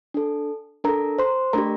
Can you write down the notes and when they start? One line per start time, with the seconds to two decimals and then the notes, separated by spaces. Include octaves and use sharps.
0.14 D4 A4
0.84 D4 A4 A#4 A#5
1.18 C5 C6
1.53 A3 D4 G4 A#4 A#5